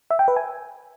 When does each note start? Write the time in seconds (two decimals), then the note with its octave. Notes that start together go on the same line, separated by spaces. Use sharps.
0.11 E5
0.19 G5
0.28 B4
0.36 G#5